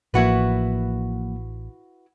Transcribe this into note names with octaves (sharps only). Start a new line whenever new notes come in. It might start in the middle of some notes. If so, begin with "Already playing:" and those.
A1 F3 A#3 E4 F#4 B4